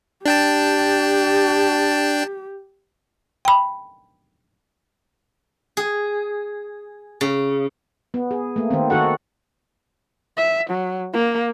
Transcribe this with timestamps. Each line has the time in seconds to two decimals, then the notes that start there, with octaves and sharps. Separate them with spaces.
0.26 D4 G4 G5 A5
3.45 G5 B5
5.77 G#4
7.21 C#3
8.14 B3
8.31 G#4
8.56 A3 A#3
8.71 D#3 B3 C4
8.90 D#3 D#4 F#4 A4 F#5
10.37 E5
10.70 F#3
11.14 A#3